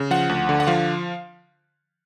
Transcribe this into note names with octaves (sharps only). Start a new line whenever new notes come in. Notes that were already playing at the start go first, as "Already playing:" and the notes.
Already playing: C#3
F3 F#5
D2
D3
F#5
F3 F5